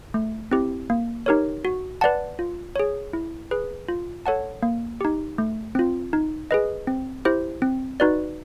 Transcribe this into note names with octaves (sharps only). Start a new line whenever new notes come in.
A3
C4 E4 G4
A#3
D#4 G4 A#4 C#5
F#4
B4 D5 F#5 A5
F4
G#4 C#5
E4
G#4 B4
F4
A4 C#5 F#5 A5
A#3
D#4 G4
A3
C4 F4
D#4
G#4 B4 D#5
C4
E4 G4 C5
C4
D#4 F#4 B4 D5